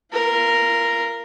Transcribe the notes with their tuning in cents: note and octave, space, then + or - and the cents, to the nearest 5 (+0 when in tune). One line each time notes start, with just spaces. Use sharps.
F4 -35 A#4 +0